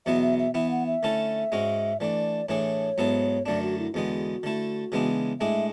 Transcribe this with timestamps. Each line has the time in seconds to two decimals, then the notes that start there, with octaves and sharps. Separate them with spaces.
0.06 E2 B2 F#3 B3 E4 E5
0.22 E5
0.39 E5
0.54 E3 B3 E4 E5
0.71 F#5
0.87 E5
1.03 D3 A3 C#4 E4 A4
1.52 G#2 G#3 C#4 F#4
2.00 E3 A3 D4 D5
2.49 A2 E3 A3 D4 G#4 C#5
2.98 G#2 F#3 B3 E4 A4
3.46 F#2 D3 F#3 A3 D4 D5
3.62 F#4
3.79 E4
3.94 E2 D3 G#3 B3 F#4
4.43 D3 A3 E4
4.92 C#3 E3 G#3 B3 D4
5.40 A2 G#3 D4 G#4 E5